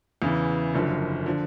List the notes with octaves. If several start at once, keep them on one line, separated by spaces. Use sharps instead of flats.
E2 C#3 E3
F#1 F#2 D3 F3
D3 F3